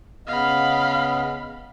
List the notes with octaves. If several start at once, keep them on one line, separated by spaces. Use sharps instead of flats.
C#3 B3 D#5 F5 B5